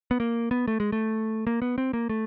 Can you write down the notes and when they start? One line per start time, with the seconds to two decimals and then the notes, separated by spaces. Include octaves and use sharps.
0.11 B3
0.20 A#3
0.51 B3
0.68 A3
0.80 G#3
0.92 A3
1.47 A#3
1.62 B3
1.78 C4
1.93 A#3
2.09 A3